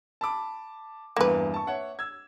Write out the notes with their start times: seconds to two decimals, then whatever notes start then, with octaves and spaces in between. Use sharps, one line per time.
0.21 A5 B5 D6
1.16 E2 G2 A#3 B4
1.54 A5 C#6
1.67 C#5 E5 F#5
1.99 E6 G#6